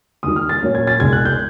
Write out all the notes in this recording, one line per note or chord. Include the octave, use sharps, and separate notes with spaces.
D#2 D#3 G3 D#6
F6
A6
A#2 F#3 A#3 C#4
G#6
A6
C2 B2 G#3 G#6
F#6
G6